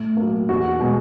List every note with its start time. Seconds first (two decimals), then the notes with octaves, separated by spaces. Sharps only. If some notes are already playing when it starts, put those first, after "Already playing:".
Already playing: A2
0.17 F#3 A#3
0.49 E2 F#4
0.79 B2 G#3